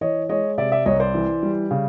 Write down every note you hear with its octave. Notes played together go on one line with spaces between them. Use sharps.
E3 C#5 D#5
G#3 C#5 D#5
C3 D5 E5
D5 E5
C2 C#5 D#5
C5 D5
E3
G3
C#3